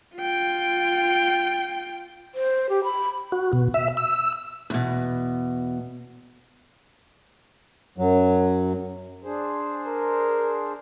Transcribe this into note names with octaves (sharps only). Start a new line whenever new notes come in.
F4 G5
C5
G4
B5
F#4
B2
E5
E6
E2 B2
F#2 F#3
D4 G#4 C5
A#4